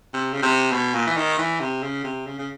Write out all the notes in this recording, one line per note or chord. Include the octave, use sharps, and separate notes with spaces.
C3
C#3
C3
B2
A#2
E3
D#3
E3
C3
C#3
C3
C#3
C#3